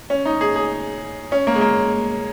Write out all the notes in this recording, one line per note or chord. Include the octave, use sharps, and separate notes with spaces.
C#4
D#4
G#4
G#4
C#4
A#3
G#3
A#3